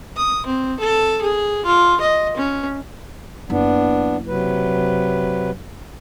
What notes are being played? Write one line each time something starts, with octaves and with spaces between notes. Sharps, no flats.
D#6
C4
A4
G#4
F4
D#5
C#4
F#1 B3 D4 E4
C3 F#3 B4